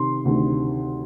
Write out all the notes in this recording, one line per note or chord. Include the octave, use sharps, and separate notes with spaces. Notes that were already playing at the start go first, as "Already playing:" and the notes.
Already playing: C3 D#3 C6
D2 C3 D#3